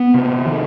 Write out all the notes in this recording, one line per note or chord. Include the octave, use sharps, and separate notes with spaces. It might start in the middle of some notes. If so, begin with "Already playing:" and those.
Already playing: B3
C3
D#3